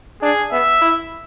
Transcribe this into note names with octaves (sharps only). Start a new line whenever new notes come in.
D4 G#4
B3 E5
E4